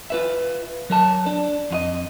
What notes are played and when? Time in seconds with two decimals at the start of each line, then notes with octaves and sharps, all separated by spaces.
0.10 F4 B4 E5
0.90 F#3 A#4 A5
1.26 D4
1.71 F2 F4 D#5